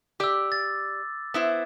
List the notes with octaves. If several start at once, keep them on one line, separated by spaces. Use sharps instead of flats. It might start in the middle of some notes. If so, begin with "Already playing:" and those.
G4 D5 D6 E6
A6
B3 E4 C5